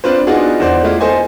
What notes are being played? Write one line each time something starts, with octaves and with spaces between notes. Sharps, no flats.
C4 D4 F4 B4 C5
B3 D4 D#4 F4 F#4 G#4
E2 C5 D5
G#3 A3 E4 F4
A4 C5 D#5 G#5